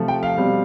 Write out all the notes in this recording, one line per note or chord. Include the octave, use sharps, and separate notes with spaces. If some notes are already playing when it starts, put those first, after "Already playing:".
Already playing: C3 F3 A3
G5
F5
B2 G3 C4